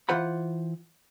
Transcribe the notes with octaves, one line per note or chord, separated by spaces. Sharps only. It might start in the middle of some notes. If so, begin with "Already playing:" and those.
E3 F4 C5 F#5 B5